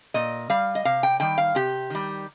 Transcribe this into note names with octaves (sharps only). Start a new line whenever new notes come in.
A#2 D#5
G3 F5
D#5
C3 F5
G5
D#3 G3 G5
F5
C3 G4
D#3 G3